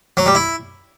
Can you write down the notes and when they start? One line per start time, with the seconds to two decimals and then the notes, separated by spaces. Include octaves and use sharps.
0.17 F#3
0.26 G3
0.35 E4